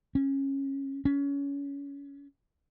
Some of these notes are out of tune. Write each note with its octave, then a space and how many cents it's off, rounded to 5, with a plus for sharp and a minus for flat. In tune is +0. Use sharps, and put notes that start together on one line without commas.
C#4 -20
C#4 +25